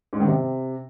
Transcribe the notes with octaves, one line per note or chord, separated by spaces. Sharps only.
G#2
D#3
C3